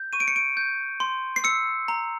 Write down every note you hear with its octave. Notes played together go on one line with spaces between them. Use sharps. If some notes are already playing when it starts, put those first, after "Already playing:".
Already playing: G6
C#6 D#7
D7
C#7
D7
G6
C6
C7
E6 C#7
A#5